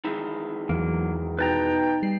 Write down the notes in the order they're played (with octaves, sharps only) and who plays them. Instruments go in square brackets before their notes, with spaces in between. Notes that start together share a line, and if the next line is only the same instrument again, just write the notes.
[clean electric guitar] D#3 E3 G#3
[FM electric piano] E2 [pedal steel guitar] F#3 A#3
[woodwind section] B2 D#4 G5 [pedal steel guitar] B4 A5 A#5
[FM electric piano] G3 C7